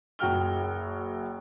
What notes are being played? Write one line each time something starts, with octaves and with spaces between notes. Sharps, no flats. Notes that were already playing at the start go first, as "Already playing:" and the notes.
F#1 F#4 G5 F6 G7